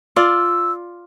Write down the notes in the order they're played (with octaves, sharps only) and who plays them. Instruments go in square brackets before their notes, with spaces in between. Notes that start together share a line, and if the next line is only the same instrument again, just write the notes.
[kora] F4 D5 [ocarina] E6